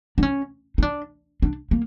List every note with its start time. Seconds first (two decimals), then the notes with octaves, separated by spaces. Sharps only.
0.18 D4
0.23 C#4
0.78 D#4
0.82 D4
1.42 D4
1.71 A#3